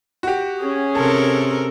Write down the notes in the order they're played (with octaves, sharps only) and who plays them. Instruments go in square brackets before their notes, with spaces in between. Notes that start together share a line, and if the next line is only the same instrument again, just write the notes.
[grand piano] F#4 G4
[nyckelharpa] C#4 G#4
[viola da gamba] C3 A4 A#4 [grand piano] A5